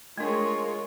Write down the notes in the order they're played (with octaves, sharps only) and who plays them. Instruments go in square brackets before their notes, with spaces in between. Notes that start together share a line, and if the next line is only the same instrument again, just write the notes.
[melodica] G#3 [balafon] A3 D4 [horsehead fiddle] F4 G#4 [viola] A#4 C#5